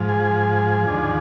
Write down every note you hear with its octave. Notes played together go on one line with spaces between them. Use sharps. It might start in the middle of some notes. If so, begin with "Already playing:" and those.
Already playing: G#2 F3
G#4
D#2 D3 F3